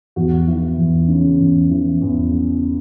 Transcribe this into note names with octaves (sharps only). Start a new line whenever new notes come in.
E2 F#4
E3
E2
C#3
E2
E3
E2
C#3